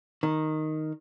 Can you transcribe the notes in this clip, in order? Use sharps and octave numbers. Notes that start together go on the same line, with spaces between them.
D#3